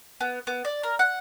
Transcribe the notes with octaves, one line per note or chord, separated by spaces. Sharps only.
B3
B3
D5
A#4
F#5